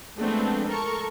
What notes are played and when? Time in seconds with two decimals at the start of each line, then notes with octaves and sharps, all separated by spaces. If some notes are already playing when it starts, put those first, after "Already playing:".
0.18 F3 G#3 A3 B3 C4 D4
0.68 A4 A#4 C#6